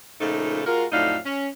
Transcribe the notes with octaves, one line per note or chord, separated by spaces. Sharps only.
A#2 C#3 F3 A3 D#4
G#3 F4 F#4 A#4
F2 A2 F#3 D4 D#4 F5
C#4